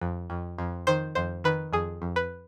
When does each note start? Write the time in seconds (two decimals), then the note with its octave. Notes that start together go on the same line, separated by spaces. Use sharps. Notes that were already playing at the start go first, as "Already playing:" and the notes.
0.01 F2
0.30 F2
0.59 F2
0.87 D#3 C5
1.15 F2 C5
1.44 D#3 B4
1.73 F2 G#4
2.02 F2
2.16 B4